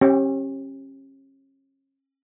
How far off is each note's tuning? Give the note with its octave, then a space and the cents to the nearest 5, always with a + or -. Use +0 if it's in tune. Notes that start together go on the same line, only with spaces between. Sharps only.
C#4 -35 G4 +0